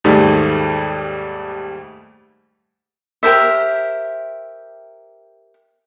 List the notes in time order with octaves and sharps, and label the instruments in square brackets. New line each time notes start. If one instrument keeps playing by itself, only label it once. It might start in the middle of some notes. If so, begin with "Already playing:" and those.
[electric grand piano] D#2 G#2 G3 A3
[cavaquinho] G4 A#4 C5 E5